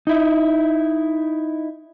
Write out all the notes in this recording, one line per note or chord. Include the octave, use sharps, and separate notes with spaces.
D#4 E4